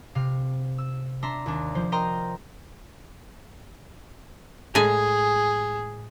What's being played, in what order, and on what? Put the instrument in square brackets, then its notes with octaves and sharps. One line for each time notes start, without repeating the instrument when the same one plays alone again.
[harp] C3 F5
E6
D4 E5 A#5 C6
D#2 D4
F3 C5
A#4 C5 D#5 G5 A#5 C6
[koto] A2 G#3 G#5 [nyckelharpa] G#4